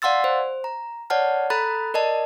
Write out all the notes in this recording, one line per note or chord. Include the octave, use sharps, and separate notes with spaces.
D5 F5 F#5 C6 E6 A6
C5
A#5
C#5 D5 F#5 A5 F6
A4 A#5 B5 F#6 A6
A#4 D5 D#5 A5